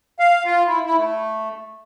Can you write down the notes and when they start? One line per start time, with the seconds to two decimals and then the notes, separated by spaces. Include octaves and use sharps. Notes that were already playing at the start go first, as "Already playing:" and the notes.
0.19 F5
0.46 F4
0.68 E4
0.85 E4
0.97 A3